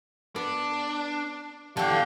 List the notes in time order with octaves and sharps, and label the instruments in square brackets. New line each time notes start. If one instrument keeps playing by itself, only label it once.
[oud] B3 [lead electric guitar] D4
[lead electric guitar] B2 G5 [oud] D3 E3 [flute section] G4 F5 [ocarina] A5